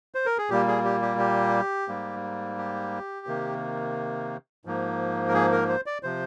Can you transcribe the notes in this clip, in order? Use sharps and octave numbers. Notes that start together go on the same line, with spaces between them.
C5
A#4
G#4
A#2 G3 A#3 G4
G#4
G4
G4
G4
G#2 G3 A#3
G4
C3 D#3 A#3
G#2 F3 A#3
A#4
G#4
A#4
C5
D5
C3 F3 C5